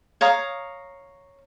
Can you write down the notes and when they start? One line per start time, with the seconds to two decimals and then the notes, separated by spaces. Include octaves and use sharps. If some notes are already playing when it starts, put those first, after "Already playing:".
0.21 C#5 F5 A#5 D#6